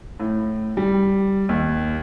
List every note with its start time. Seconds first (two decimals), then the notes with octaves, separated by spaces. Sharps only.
0.20 A2
0.77 G3
1.49 D#2